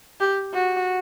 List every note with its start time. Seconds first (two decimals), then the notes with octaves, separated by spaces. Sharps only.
0.20 G4
0.54 F#4